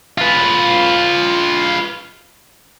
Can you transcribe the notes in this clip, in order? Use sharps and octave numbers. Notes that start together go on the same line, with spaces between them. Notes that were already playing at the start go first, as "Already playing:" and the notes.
F4 B4